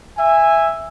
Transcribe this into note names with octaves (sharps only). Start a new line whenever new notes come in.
E5 G#5